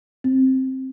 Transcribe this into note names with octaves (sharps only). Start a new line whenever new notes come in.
C4